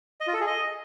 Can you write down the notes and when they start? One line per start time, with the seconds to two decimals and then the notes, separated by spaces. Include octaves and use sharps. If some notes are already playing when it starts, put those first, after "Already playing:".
0.21 D#5
0.27 F4
0.34 A4
0.40 G#4
0.47 D#5